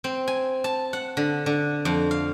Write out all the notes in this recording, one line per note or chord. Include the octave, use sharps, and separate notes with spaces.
C4
G#5
A5
F#5
D3
D3
F2
F5